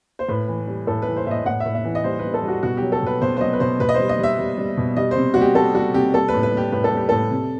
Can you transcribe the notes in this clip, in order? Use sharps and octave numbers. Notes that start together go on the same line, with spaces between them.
C5
A2 B4
E3
G3
A2 A4
E3 B4
C5
A2 E5
D#5
A2 F#5
E5
A2
E5
E3
D#5
G3 C5
B4
G3
A4
G3
F#4
B2 F#4
F#3 G4
A4
B2 B4
B2 C5
C5
F#3 D#5
B4
B2 C5
B2 B4
D#5
C5
G3
D#5
G3 E5
G3
G3
B2
G3 D#5
C5
C3
G3 F#4
G4
G3 A4
G3 F#4
C3 G4
G3 A4
B4
A2
B4
G3 G4
A2 B4
A4
G3 G4
A2 A4
C3